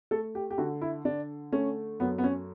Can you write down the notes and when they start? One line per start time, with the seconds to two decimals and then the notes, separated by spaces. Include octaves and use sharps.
0.11 A3 A4
0.35 G4
0.51 G4
0.58 D3 F#4
0.82 E4
1.05 D3 D4
1.52 A3 C#4
2.00 F#2 B3
2.18 B3
2.24 C#4